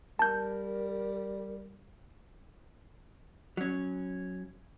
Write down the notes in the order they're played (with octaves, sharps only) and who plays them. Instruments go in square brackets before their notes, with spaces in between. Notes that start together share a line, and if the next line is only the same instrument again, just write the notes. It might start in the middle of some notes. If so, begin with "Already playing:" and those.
[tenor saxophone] G3 [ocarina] A#4 [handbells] A5 G6
[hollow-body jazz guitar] F#3 C#4